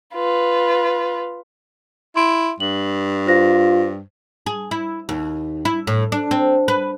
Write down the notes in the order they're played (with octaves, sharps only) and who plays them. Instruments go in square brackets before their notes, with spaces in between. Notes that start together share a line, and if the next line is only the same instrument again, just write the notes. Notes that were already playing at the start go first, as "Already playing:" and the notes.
[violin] F4 B4
[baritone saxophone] E4 [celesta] C6 D7
[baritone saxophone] G2 [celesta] F#7
[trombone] F4 [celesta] C5 A#6
[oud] G#4
E4
D#2
E4
A2
D4
C4
B4